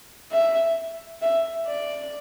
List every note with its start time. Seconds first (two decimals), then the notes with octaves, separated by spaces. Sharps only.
0.31 E5
1.22 E5
1.67 D5